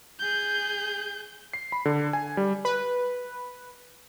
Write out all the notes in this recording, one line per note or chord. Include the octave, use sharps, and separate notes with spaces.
G#4 G6
C7
B5
D3
G#5
G3
B4